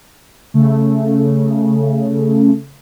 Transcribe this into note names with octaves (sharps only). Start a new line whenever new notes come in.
C#3 A3